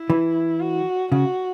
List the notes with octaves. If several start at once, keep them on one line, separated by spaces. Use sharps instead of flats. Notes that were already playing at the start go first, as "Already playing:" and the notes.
Already playing: E4
E3
F#4
C#3 F#4